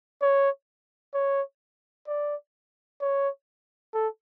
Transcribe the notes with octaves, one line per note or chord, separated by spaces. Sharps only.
C#5
C#5
D5
C#5
A4